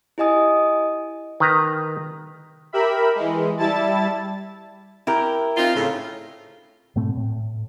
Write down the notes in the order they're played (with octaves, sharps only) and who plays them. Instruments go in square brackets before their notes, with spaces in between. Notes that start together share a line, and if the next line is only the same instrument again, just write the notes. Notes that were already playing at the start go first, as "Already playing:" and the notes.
[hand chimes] E4 G4 D#5 G#5 D#6
[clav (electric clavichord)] D#3 B4 A#5
[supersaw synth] G4 A#4 E5 B5
E3 G#3
G3 E4 A5 A6
[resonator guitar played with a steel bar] E4 G4 A#4
[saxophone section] C4 D#4 F4
A2 C#3
[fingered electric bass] G#2 B2 A3 C4
A2